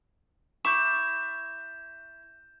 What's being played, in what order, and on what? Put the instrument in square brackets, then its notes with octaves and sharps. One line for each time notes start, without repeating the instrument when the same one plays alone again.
[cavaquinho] E4 C#6 D6 [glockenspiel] G6 E7